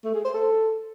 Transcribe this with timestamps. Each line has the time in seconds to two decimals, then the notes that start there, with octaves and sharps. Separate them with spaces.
0.04 A3
0.14 G#4
0.24 C5
0.34 A4